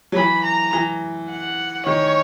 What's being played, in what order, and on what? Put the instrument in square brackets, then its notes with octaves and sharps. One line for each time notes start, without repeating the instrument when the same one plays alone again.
[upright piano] F#3
[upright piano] E3 [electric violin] B5
[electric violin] A#5
[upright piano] E3
[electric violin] F#5
[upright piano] D#3 [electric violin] C#5